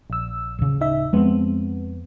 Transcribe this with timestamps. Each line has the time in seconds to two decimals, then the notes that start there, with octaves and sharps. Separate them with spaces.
0.10 A#1 E6
0.59 D1 C#3
0.81 D#4 E5
1.13 F2 G#3 B3 C4